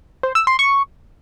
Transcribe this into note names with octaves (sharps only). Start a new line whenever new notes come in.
C5
E6
C6
C#6